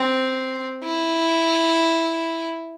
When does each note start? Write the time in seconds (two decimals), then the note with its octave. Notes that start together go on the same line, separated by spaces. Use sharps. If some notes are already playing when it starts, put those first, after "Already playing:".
Already playing: C4
0.83 E4